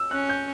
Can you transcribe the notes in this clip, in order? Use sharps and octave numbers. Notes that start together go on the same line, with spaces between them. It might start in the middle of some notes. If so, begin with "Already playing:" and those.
Already playing: E6
C#4 F#6
G6